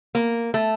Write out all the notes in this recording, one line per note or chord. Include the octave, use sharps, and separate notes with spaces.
A#3
A3